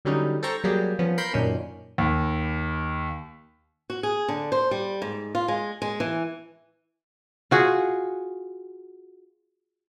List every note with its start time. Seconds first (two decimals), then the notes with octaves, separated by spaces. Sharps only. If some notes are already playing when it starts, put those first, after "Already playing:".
0.05 D3 F#3 G3 C#4 D#4
0.43 A4 C5 G5 A#5 C#6
0.64 F#3 G3 A#3 G4 G#4
0.99 F3 B3 C#4
1.18 A#4 B5 C6 G6
1.33 F#2 A#2 D#3 C#4 D4
1.98 D#2
3.90 F#4
4.03 G#4
4.28 D3
4.52 C5
4.71 G3
5.02 G#2
5.35 F4
5.48 G#3
5.82 G#3
6.00 E3
7.51 F4 F#4 G#4